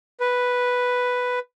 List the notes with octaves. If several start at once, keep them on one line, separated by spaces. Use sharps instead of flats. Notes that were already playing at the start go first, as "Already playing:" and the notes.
B4